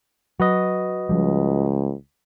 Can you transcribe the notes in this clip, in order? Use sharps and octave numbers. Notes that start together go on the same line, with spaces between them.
F#3 F#4 B4 D#5
C#2 F3 G3